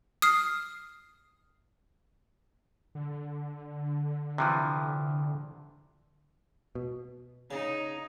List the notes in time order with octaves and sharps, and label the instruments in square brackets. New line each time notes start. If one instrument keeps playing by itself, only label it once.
[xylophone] D#6 F6 C7
[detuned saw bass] D3
[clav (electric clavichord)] C3 E3 F3
[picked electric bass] B2
[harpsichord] C#3 [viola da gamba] D#4